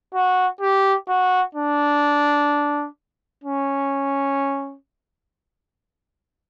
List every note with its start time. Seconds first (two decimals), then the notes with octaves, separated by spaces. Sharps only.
0.14 F#4
0.61 G4
1.08 F#4
1.55 D4
3.44 C#4